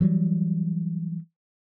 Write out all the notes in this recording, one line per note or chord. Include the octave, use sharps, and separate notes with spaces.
E3 F#3 G3